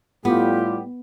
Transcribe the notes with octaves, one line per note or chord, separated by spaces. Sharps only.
A2 G3 B3 F4 G4